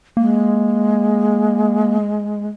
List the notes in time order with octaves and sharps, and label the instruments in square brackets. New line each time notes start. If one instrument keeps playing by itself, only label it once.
[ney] G#3 [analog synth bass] A#3